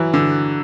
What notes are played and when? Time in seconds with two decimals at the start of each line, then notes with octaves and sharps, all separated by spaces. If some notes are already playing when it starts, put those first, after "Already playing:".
Already playing: E3 F#3
0.14 D3